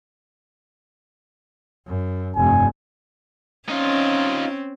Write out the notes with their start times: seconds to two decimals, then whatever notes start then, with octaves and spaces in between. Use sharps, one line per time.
1.87 F#2
2.36 F1 G2 G#5
3.69 C4 C#4 D#4 F4